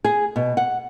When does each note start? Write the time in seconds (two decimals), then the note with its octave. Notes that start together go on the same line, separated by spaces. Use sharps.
0.04 G#4
0.36 B2
0.57 F#5